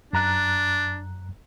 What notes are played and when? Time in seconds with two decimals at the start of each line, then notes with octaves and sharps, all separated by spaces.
0.13 F#2 D4 A#5 F#6